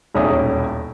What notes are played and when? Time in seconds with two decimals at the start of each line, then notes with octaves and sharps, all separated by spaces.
0.14 D#1 B1 E2 C#4 E5 D#6